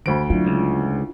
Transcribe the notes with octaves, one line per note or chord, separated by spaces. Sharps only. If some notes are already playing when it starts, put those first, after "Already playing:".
D2 D3 C5 B5 D7
F#3 D4 E4 F4
C#2